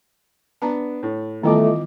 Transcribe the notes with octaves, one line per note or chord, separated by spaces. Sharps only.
B3 D4 A5 A#5
A2
D#3 E3 G3 A3 B3 F4 D#5 D6